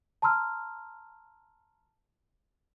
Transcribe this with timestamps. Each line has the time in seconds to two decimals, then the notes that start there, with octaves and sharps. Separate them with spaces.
0.22 A5 A#5 C6 E6 F6